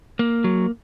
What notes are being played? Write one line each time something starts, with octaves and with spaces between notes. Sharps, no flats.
A#3
F#3